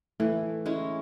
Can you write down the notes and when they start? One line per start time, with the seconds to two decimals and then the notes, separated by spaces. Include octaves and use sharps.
0.20 E3 A3
0.66 G#3 C#4 E4